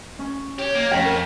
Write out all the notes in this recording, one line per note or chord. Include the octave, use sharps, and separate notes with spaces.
C#4
G4 C#5
A#3
F2 C#4 D4 G5
A#4